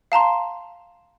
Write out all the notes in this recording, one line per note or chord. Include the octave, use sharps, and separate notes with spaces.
F5 A5 A#5 C6